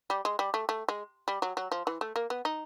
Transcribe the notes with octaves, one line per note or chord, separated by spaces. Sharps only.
G3
G#3
G3
A3
A3
G#3
G3
F#3
F#3
F3
E3
A3
A#3
B3
D#4